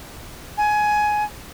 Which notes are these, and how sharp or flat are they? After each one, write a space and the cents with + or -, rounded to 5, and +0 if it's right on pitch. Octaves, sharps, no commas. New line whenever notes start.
G#5 +15